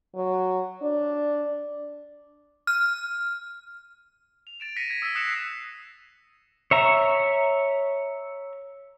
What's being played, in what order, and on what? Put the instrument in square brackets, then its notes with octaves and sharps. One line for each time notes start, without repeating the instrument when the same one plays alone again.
[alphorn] F#3
D4
[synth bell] F6
[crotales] F7
A6 D7 E7
A#6 B6 C#7 D#7
G#6
D#6 E6 G#6 A6 B6
D#6 F#6 A#6 C7 C#7 E7
[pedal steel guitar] C#5 E5 A#5